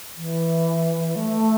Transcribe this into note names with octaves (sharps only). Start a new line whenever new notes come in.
E3
A3